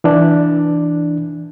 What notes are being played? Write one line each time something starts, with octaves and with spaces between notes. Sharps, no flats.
E3 D4